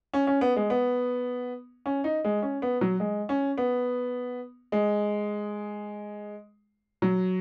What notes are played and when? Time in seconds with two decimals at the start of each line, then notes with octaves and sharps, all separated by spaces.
0.13 C#4
0.27 C#4
0.41 B3
0.56 G#3
0.70 B3
1.86 C#4
2.04 D#4
2.24 G#3
2.42 C#4
2.62 B3
2.81 F#3
3.00 G#3
3.29 C#4
3.58 B3
4.72 G#3
7.02 F#3